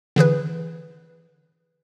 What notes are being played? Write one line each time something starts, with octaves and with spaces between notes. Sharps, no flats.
D3 E3 G#4 B4